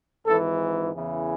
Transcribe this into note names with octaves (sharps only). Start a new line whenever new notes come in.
G#1 G#2 E3 A4
E2 C#3 E3